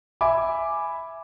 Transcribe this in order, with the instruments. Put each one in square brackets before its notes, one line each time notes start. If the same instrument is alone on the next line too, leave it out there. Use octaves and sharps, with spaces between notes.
[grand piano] E5 G#5 B5 D6